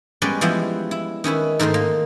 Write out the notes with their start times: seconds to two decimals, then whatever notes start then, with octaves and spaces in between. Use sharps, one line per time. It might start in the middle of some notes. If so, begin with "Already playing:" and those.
0.22 G3 G#3 B3 C#4 B4 D5
0.41 E3 F3 G3 G#3 B3 E4
0.91 E4
1.24 D#3 C#4 E4 B4
1.59 G#2 D#3 A3 A#4 C5
1.74 A#3